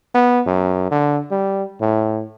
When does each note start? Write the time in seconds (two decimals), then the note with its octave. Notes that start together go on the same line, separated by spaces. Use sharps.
0.15 B3
0.46 F#2
0.91 D3
1.31 G3
1.81 A2